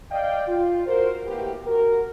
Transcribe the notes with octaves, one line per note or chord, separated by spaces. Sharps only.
D5 D#5 F5 G5
F4
F#4 A#4 C5
A2 A#3 B3 F#4 G4
F#4 A#4